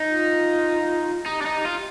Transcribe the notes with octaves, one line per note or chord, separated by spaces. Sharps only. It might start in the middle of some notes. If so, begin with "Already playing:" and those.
Already playing: D#4
F4
D#4 G4
D4
D#4
F4